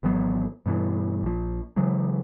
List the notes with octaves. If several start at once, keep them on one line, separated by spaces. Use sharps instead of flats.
G#1 E3 F#3 B3
G2 B2 D#3 E3
A#1 F3
C#3 E3 F#3 G#3